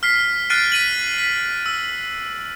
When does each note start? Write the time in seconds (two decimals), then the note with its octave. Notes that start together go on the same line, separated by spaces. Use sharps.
0.03 F6 B6 C7
0.50 F6 F#6 A6 C7 D7 D#7
0.72 B6 D#7 F#7
1.18 B6
1.66 E6